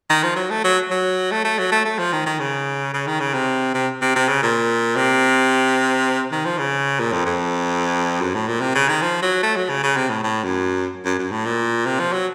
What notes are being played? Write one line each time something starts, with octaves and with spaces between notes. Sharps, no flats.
D#3
F3
F#3
A3
F#3
F#3
A3
A3
F#3
A3
A3
F3
D#3
D#3
C#3
C#3
D#3
C#3
C3
C3
C3
C3
C#3
A#2
C3
D#3
F3
C#3
A#2
F2
F2
F#2
A2
A#2
C3
C#3
D#3
F3
F#3
A3
F#3
C#3
C#3
C3
A2
A2
F#2
F#2
F#2
A2
A#2
C3
F3
F#3